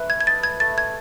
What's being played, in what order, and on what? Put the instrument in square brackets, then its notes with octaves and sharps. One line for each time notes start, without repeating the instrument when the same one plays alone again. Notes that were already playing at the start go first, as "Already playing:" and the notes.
Already playing: [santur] A3 E4 B4
[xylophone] G#6
G#6
[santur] D#5 [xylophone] A6
[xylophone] G#6
[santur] A3 [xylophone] A6
[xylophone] G#6